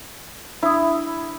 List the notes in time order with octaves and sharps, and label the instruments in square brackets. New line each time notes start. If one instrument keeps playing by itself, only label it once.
[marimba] D4 D#6 [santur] E4